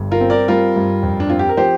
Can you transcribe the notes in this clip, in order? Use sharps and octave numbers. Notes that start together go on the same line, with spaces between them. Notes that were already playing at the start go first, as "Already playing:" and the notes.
Already playing: G1 G2
F4 A#4
C4
A#4 D5
G3 F4 A#4
G2
F2
D4
C4 F4
G4
A#4
F3 G4 C5